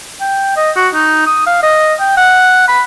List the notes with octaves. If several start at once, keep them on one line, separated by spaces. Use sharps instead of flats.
G5
D#5
F#4
D#4
D#6
F5
D#5
G5
F#5
B5